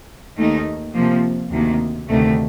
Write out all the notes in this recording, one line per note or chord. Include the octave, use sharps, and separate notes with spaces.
D#2 D#3 A3 D#4
C3 F3 A#3
D2 C3 D#3 A#3
D2 C3 D#3 A3